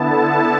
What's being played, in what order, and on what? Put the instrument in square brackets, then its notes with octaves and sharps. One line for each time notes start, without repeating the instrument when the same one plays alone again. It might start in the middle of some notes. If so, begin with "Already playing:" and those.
Already playing: [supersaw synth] D3 B3 E4 A5
A4